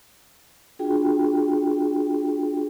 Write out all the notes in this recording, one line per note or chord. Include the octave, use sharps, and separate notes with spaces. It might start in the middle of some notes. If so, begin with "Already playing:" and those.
D4 F4 F#4 G#4 G5